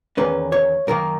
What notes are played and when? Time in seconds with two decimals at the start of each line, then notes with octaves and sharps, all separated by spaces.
0.17 E2 D#3 A#3 C#4 B4
0.52 C#5
0.87 F#2 D#3 A#3 A#4